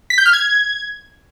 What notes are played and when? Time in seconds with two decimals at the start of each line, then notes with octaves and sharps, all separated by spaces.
0.10 B6
0.18 G6
0.26 F6
0.33 G#6